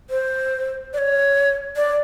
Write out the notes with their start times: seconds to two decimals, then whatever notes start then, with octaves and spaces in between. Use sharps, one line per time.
0.10 C5
0.93 D5
0.98 C#5
1.76 D5